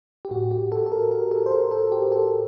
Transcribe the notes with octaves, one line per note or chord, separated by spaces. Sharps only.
G4
A2 F#4
G4
A4
A4
A#4
A#4
A4
C5
A#4
A4
G4
A4